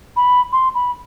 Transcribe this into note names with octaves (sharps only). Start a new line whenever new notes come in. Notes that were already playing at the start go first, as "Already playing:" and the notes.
B5
C6
B5